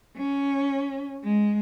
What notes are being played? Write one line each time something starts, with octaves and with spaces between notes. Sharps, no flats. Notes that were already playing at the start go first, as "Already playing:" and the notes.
C#4
G#3